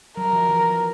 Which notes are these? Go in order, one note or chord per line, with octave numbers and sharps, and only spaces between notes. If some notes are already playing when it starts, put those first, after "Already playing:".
F#3 A#4
F3
E3